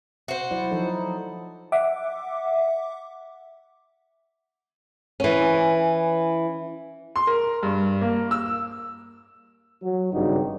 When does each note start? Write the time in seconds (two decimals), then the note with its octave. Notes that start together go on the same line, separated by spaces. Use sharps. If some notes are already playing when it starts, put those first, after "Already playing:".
0.28 F#4 C5
0.51 F#3 E4 D5
0.71 F3 D#4 A4
1.72 E5 F#5 D6
5.20 E3 C#4
7.16 C6
7.27 A#4
7.63 G2
8.01 A#3
8.31 E6
9.82 F#3
10.13 G#1 G2 C#3 G3 D#4 F#4